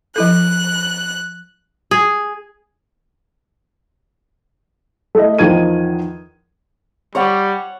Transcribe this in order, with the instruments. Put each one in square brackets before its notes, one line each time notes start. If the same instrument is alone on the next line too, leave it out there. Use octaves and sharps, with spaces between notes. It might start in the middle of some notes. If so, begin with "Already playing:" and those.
[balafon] F3 E4 A4 [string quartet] F#6
[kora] G#4
[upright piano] A3 E4 D#5
E2 D#3 F3 G#6 D#7
[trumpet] G3 [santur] C#5 F#5 C#6